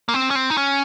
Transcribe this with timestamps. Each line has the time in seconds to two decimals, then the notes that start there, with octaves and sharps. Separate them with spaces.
0.09 A#3
0.14 C4
0.30 C#4
0.35 C4
0.50 D#4
0.57 C#4